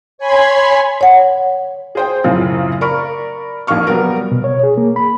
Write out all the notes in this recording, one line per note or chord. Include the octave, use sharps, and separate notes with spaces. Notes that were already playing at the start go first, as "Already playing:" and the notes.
C#5 G#5 B5 C6 G#6
C#5 F#5
G#4 C5 G5
F#2 A2 C#3 C4 F4
A#4 D5 B5 C#6
A#1 F2 A#3 F5 C#6 F6
F#3 G3 B3 A#4
B2
C#5
G#4
A#3
B5